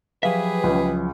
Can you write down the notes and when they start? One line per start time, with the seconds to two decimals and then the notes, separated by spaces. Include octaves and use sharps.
0.23 F3 F#3 G4 G#4 B4 E5 F5
0.63 C#2 C#3